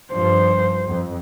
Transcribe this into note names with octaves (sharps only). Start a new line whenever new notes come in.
G2 F3 C5
F2